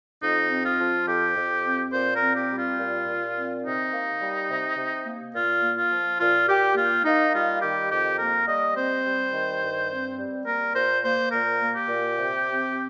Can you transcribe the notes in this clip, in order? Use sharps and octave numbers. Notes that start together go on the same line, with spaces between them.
F2 D#4
C4
F4
F3
F2 G4
F2
C4
A#2 C5
A#4
C4
G4
G3
F4
A#2
A#2
C4
C3 D#4
A#3
G3
C3
C3
A#3
A#2 F4
A#3
F4
F3
A#2 F4
A#2 G4
A#3 F4
A#3 D#4
G3 F4
D#3 G4
F2 G4
A#3 A#4
G3 D#5
C4 C5
G3
D#3
G2
C4
G3
A#3 A#4
A#2 C5
A#3 C5
A#2 A#4
A#3
G4
A#2
C3
C4